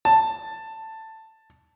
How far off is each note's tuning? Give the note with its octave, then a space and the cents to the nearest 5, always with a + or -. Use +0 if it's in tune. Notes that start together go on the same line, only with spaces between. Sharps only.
A5 +10